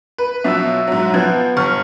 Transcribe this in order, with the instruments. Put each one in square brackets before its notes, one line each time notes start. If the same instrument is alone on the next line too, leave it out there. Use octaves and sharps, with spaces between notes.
[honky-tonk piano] B4
[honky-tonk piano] B2 F3 F#3 [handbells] E5 E6
[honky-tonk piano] G#2 F#3
[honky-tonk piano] F3 [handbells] B3 B4 G#6
[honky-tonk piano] G1 F6 [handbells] C#6